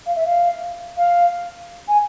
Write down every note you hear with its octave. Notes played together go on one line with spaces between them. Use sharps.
F5
E5
F5
F5
G#5